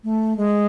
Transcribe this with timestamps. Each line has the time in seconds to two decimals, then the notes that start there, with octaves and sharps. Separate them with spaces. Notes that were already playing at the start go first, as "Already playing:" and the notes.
0.04 A3
0.37 G#3